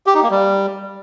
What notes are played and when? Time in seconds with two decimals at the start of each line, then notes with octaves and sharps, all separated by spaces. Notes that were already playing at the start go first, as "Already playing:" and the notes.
0.07 G4
0.15 D#4
0.23 A#3
0.31 G3